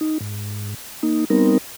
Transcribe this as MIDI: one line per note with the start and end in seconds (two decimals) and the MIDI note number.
0.01 0.18 63
0.21 0.74 44
1.03 1.25 58
1.03 1.25 63
1.30 1.58 55
1.30 1.58 59
1.30 1.58 60
1.30 1.58 63
1.30 1.58 70